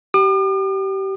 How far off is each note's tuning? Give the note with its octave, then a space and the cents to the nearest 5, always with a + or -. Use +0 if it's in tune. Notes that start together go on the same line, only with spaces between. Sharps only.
G4 -25 D6 +45